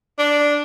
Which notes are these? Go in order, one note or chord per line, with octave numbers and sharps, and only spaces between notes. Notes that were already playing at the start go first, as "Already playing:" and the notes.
D4